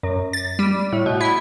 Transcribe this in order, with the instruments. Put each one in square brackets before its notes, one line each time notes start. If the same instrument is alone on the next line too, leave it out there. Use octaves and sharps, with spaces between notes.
[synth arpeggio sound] F#2
A6
G3
A2
B2
E4